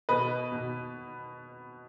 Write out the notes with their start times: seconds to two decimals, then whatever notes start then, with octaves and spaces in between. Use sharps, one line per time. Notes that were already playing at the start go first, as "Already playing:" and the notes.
0.09 B2 B4 D#5
0.52 B2